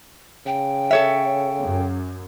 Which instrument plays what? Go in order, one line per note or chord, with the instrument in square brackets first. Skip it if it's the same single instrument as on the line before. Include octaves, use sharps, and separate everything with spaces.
[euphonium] C#3 [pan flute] G5
[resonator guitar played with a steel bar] A4 C#5 E5
[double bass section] F#2